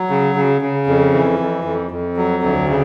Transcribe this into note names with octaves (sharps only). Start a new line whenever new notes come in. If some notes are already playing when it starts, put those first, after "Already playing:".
Already playing: F#3
C#3
C#3
C#3
F2
E3
F2
F2
F2
F#3
D2
C#3